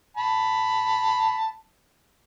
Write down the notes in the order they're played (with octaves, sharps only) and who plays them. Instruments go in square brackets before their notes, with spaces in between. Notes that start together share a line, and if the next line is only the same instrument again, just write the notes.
[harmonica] A5 B5